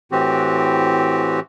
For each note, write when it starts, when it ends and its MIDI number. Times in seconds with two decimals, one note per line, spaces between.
0.12 1.40 45
0.12 1.40 52
0.12 1.40 60
0.12 1.40 66
0.12 1.40 67